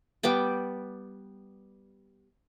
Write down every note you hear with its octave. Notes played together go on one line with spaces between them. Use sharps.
G3 B3 G5 A5